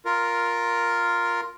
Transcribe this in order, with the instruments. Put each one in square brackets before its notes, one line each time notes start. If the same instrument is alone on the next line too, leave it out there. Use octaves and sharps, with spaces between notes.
[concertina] F4 A#4